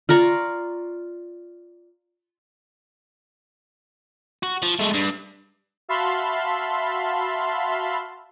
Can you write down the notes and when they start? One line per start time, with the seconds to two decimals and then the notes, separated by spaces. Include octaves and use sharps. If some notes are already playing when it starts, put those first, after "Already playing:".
0.09 F4 D5 A#5 C#6
4.43 F#4
4.63 F3
4.79 G#3 A3
4.94 G2
5.88 F#4 E5 F5 A5 B5 C6